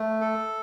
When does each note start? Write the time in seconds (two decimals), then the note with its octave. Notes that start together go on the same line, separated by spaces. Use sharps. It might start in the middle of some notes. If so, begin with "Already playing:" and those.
Already playing: A3
0.21 A4